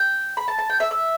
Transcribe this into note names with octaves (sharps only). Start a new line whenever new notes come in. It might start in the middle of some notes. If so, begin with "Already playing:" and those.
Already playing: G5
B5
A5
A5
G5
E5
E5